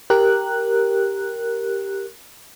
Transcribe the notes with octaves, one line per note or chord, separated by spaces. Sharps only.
G4 A#4 F#6